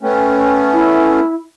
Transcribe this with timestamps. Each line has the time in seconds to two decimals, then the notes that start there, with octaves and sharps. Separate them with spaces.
0.03 A3 B3 C#4 G5
0.73 E4